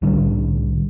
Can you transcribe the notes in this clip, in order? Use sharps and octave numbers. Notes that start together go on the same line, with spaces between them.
C2 A2 D3 G3